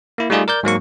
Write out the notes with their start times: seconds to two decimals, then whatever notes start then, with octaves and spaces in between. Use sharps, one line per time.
0.18 A#3 E4
0.30 G3 A3 D#4 F4 G#4 D5
0.48 A#4 D5 G6
0.63 G#2 F#3 A#3 C#6